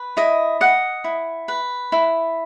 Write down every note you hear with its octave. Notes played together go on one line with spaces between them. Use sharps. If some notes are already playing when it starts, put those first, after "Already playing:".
Already playing: B4
E4 D#5
D#5 F#5
E4
B4
E4